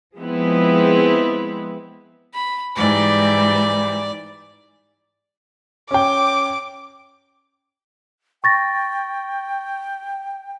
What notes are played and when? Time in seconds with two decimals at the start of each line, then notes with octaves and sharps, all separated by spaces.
0.17 F3 G#3 B3 C4 E4
2.34 B5
2.76 G#2 E3 G3 D5
5.91 C#4 G5 D6
8.44 G5 C#6 A6 A#6